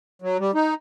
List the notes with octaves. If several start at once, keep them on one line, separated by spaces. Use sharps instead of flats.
F#3
G3
D#4